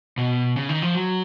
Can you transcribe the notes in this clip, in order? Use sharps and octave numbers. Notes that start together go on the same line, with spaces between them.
B2
C#3
D#3
F3
F#3